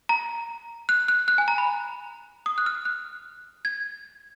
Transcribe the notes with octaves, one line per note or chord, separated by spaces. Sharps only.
A#5
F#6
F#6
F#6
G#5
A#5
B5
D#6
F#6
F6
F#6
G#6